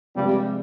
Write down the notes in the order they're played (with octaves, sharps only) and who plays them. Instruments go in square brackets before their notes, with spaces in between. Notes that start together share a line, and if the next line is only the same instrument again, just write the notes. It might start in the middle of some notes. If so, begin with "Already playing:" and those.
[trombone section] G2 G3 [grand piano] C3 F3 G#3